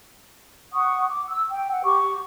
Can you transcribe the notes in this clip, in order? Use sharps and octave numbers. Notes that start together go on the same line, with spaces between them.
F#5 C#6 D#6
D6
E6
G5
F#5
G4 C#6 D6